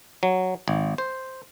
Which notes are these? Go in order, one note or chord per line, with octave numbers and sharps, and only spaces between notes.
F#3
G#1
C5